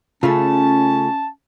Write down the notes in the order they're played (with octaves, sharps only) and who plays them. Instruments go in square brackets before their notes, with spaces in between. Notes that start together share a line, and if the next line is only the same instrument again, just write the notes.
[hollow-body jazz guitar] C#3 A3 [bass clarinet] C#4 [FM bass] F4 [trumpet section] A5